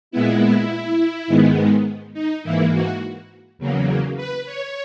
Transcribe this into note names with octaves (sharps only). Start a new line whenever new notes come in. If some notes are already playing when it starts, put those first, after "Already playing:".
A#2 G#3 B3 E4
G#2 D#3 G#3 B3
D#4
G#2 E3 A#3 E4
F#4
E2 C#3 F#3 A#3
B4
C#5